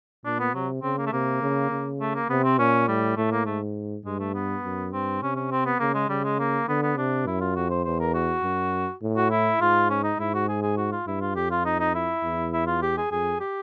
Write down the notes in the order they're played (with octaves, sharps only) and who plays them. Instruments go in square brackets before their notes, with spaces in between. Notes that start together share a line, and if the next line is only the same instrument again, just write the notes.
[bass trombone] A#2 [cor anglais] D4
[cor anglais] B3
[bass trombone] C3 [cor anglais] F#3
[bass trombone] C#3 [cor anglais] C4
[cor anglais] A#3
A3
[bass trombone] C3 [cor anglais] A#3
[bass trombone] C#3
C#3
[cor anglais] A3
A#3
[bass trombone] C3 [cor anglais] B3
[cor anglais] C4
[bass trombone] A#2 [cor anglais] C#4
[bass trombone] A2 [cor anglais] G3
[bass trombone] A2 [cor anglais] A3
[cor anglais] A#3
[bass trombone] G#2 [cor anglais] A3
[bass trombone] G2 [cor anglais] G#3
[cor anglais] A3
B3
[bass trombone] F#2
[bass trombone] G2 [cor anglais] C4
[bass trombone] C3 [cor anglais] C#4
[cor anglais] C#4
C4
B3
[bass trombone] C#3 [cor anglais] A#3
[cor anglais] G#3
[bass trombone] C#3 [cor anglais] G3
[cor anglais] G#3
A#3
[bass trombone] D3 [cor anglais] B3
[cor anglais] B3
[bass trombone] C3 [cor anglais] D4
[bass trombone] F#2 [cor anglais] E4
[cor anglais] F4
[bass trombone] F2 [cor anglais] F#4
[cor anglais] C5
[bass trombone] E2 [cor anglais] C5
[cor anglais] A#4
F#4
[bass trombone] F#2
A2
[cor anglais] F#4
E4
[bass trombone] G#2 [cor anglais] F4
[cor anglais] C#4
D#4
[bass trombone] G#2 [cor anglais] E4
[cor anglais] F#4
G#4
G#4
F#4
F4
[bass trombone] G2 [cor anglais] E4
[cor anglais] F4
[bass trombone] F2 [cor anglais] G4
[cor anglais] F4
D#4
D#4
E4
[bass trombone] E2
[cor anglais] E4
F4
G4
G#4
[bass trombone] F2 [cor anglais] G#4
[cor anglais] G4